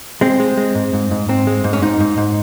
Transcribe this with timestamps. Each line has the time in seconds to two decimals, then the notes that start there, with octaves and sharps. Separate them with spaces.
0.21 G#3 C4
0.40 G#3
0.57 G#3
0.75 G#2
0.93 G#2
1.11 G#2
1.29 G#2 C4
1.47 G#3
1.64 G#2
1.73 C#4
1.82 G#2 D#4
2.00 G#2
2.18 G#2